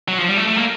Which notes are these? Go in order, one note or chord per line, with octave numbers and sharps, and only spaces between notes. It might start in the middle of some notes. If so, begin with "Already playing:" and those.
F#3
F3
G3
A3
A3
A#3